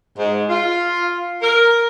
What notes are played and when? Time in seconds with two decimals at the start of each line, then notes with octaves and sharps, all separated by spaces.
0.17 G#2
0.50 F4
1.42 A#4